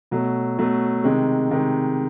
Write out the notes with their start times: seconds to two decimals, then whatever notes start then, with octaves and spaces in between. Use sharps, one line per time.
0.11 B2 F#3 A3
0.58 B2 F#3 A3
1.04 C3 D#3 G#3
1.50 C3 D#3 G#3